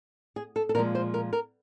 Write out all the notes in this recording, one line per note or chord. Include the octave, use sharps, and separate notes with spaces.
G#4
A4
A4
A#2 F3 G#3 A#4
C5
A#4
A#4